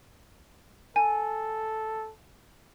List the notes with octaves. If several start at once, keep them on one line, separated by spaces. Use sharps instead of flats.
A4 G#5